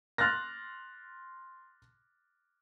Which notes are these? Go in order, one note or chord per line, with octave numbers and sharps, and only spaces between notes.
C6 F6 F#6 A6 A#6